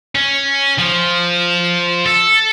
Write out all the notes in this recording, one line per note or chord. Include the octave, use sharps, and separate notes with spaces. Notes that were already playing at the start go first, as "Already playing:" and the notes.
C#4
F3
A4